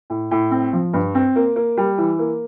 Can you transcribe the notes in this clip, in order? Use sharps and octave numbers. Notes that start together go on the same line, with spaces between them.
A2
A2
C4
F3
G2
C4
A#3
A#3
G3
E3
A#3